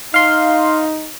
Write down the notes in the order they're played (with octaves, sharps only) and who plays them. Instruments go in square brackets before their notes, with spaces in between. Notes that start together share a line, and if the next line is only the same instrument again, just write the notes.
[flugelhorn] D#4 [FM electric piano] F5 C6